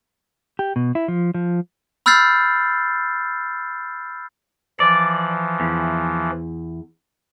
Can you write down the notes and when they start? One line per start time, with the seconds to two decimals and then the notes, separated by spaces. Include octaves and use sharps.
0.59 G4
0.76 B2
0.95 E4
1.08 F3
1.34 F3
2.06 B5 E6 F6 G6 A6 C7
4.80 E3 F3 D5
5.60 E2